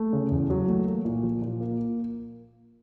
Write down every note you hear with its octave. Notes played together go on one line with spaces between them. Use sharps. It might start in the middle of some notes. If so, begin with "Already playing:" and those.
Already playing: A3
C#3
E2
F#3
A3
A#3
A#2
F3
A#2
A#3